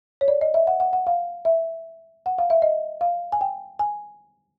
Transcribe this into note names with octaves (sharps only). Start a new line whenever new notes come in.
C#5
D5
D#5
E5
F#5
F#5
F#5
F5
E5
F#5
F5
E5
D#5
F5
G#5
G5
G#5